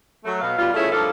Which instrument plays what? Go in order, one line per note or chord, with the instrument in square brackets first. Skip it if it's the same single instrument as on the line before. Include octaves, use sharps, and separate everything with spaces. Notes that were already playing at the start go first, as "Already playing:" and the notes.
[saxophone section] F#3 A3
B2 F5
B2 G3 F4
E3 A3 C#4 E4 F4 G#4
G2 F3 A#3 A4 F5